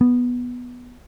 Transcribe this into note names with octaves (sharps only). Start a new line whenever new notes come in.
B3